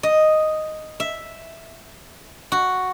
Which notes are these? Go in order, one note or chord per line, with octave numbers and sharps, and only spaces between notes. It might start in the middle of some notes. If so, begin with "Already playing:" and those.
D#5
E5
F#4